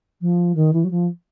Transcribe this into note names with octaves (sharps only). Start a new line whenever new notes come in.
F3
D#3
E3
F#3
F3